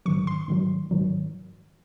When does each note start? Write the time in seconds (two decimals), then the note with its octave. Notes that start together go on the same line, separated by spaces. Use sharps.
0.06 G#2 D#3 F#3 C#6
0.27 C6
0.48 G#2 D#3 F#3
0.91 G#2 D#3 F#3